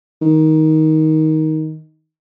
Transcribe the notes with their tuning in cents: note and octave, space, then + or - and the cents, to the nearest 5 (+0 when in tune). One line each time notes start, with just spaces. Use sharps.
D#3 +15